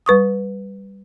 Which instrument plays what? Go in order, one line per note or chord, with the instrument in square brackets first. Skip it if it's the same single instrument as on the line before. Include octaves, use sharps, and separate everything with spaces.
[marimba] G3 B4 C#6 D#6